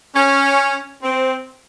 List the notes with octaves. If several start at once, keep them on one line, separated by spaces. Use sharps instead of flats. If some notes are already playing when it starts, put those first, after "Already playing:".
C#4
C4